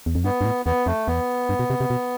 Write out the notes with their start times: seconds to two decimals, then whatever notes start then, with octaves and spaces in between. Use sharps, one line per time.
0.06 E2
0.15 F2
0.24 G2 B3
0.41 G2
0.45 A2
0.65 E2 B3
0.86 F2 A3
1.07 E2 B3
1.49 G2
1.59 B2
1.70 C3
1.80 C3
1.90 B2